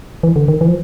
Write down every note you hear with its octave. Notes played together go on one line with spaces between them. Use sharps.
E3
D3
D#3
E3
F3